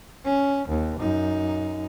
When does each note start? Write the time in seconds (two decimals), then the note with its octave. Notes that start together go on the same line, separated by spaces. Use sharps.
0.25 C#4
0.68 D#2
1.00 F#2 D#4